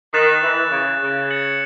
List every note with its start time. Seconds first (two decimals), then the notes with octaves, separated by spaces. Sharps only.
0.14 D#3 F#6 A6 E7
0.43 E3
0.72 C#3
1.02 C#3
1.31 G#6 C#7 F#7